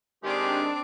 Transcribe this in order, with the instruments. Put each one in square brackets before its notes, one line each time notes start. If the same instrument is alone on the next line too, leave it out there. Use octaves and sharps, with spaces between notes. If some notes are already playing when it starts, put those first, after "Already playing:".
[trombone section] D#3 G#3 [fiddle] C4 D6 [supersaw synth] D4 [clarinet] G4